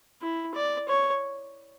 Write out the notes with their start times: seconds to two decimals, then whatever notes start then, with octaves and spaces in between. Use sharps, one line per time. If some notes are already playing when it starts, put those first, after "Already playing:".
0.22 E4
0.55 D5
0.88 C#5